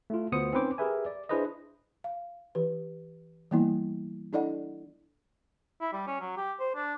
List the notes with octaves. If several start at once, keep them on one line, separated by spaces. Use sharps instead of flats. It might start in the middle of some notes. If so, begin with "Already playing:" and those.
A3 E4 F4
D2 B3 F4 C5 D#6 C#7
C4 C#4 D#4 B4 C5 D6
G4 G#4 A#4 B4 E5 G#5
D5
D4 E4 G#4 B4 C5 D#5
F5
E3 G4 B4
E3 G3 A#3 B3 E4
D4 E4 A4 D5 D#5 F#5
E4
G3
C#4
F#3
G4
C5
D4